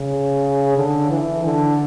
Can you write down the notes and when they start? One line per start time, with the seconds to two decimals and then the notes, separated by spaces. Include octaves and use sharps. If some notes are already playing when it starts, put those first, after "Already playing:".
Already playing: C#3
0.78 D3
1.10 E3
1.44 D3